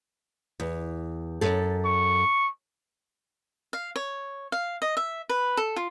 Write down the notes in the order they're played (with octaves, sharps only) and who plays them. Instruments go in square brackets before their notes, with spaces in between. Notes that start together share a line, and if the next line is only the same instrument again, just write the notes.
[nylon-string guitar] E2
F#2 A4
[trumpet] C#6
[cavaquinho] F5
C#5
F5
D#5
E5
B4
A4
F4